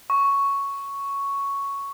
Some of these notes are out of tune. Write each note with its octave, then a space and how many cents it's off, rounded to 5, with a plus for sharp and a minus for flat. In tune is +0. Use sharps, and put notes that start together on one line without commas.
C#6 +5